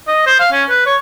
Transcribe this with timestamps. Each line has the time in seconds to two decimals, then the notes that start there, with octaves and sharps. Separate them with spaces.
0.07 D#5
0.27 C5
0.39 F5
0.52 C#4
0.69 B4
0.86 C#5